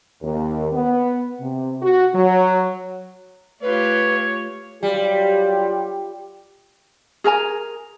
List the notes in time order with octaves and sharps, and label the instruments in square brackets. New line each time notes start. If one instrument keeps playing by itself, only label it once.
[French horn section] D#2
B3
C3
F#4
F#3
[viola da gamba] A3 F4 G4 [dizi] B4 [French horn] C#5
[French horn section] F#3 F4 G4 [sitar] G3
[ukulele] G#4 A#4 G#5 A#5